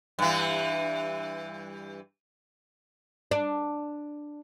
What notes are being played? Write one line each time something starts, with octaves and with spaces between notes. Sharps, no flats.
G2 E3
D4